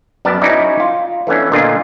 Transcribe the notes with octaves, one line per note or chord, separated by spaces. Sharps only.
F#2 B3 D5 A5
C#4 D#4 E4 F#4 B4 D5
F4
E3 A3 B3 C#4 D4
A#2 D3 A#3 D4 F4 D#5